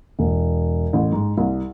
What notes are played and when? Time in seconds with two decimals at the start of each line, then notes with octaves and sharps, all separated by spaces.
0.19 E1
0.93 A1
1.12 G#2
1.38 C2